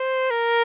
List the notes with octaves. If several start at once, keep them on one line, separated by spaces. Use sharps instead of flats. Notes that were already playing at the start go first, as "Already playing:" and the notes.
Already playing: C5
A#4